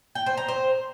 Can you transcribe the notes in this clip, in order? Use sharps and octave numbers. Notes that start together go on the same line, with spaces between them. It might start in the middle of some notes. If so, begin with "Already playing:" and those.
G5
C5
A#5
C5